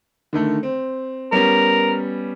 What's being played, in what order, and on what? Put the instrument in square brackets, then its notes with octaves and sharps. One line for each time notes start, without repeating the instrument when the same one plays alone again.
[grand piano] D3 D#3 A3
C4
[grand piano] G3 B3 C#4 [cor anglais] A#4